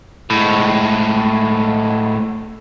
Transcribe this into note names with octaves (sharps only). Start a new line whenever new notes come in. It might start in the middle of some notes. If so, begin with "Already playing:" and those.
A2 G#3